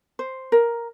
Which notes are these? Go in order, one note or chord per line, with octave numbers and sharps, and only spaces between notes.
C5
A#4